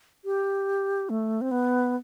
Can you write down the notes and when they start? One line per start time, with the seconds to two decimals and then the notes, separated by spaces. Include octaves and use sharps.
0.25 G4
1.10 A3
1.41 C4
1.51 B3